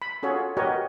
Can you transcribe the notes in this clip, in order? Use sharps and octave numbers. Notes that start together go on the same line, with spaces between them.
B5
C#4 F4 F#4 G#4 A4 C#5
F#4 G4 A#4 B4 C#5 D#5